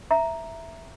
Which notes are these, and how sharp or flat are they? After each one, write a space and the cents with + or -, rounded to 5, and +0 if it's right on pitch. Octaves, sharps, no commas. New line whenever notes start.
E5 +0 A#5 +0